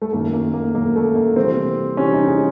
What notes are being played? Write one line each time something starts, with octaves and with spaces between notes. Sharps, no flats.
A3
F#2 D#3 F#3 A3 A#3
A#3
A#3
F#2 D#3 F#3 A3 A#3
A3
A#3
C3 E3 G3 C4
C3 E3 G3 C#4
D#4
G#4